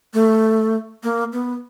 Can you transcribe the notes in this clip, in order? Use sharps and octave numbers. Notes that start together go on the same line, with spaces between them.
A3
A#3
B3